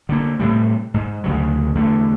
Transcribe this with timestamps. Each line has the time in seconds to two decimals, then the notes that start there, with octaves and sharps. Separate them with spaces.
0.09 D3 A#3
0.39 A2 C3 G3
0.94 G#2
1.24 D2 C#3 F#3
1.75 E2 D3 A3